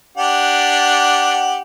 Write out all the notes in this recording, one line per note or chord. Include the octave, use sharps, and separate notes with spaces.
D4 G4 F#5